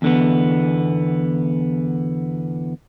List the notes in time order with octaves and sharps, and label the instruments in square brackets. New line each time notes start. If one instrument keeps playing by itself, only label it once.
[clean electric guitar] E2 D3 B3